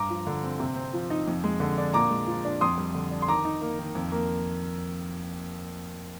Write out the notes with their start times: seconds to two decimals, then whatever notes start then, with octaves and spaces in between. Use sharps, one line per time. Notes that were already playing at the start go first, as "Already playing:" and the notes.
Already playing: G2 A#5 D6
0.10 F3
0.27 D3
0.43 C4
0.60 C3
0.76 C4
0.93 F3
1.10 D#4
1.28 F2
1.44 G#3
1.60 D3
1.78 D4
1.93 A#2 A#5 D6
2.10 G#3
2.27 F3
2.45 D4
2.61 F2 C6 D#6
2.78 G3
2.94 D3
3.11 D4
3.22 C6
3.28 D#3 A#5 D6
3.45 D#4
3.61 A#3
3.79 D#3
3.95 F2
4.12 A#3